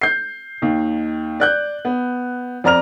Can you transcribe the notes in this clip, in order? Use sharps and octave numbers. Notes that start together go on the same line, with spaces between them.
G6 C7
D#2 D#3
D5 F#6 G6
B3
F2 D5 A#5 F6 F7